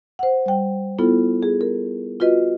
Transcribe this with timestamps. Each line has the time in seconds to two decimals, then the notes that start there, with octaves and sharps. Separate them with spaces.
0.19 C5 F#5
0.46 G3 G5
0.99 B3 E4 F4 A4
1.43 G#4
1.61 A#4
2.20 F4 F#4 B4 D#5